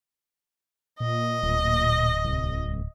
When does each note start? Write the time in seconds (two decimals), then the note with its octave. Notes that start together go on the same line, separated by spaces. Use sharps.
1.00 A#2 D#5
1.43 D1
2.24 C2